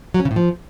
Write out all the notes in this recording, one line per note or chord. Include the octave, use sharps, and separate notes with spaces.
F#3
C#4
C#3
A2
F3